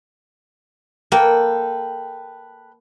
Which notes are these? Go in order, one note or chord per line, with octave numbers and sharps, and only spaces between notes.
A#3 A4 B4 G5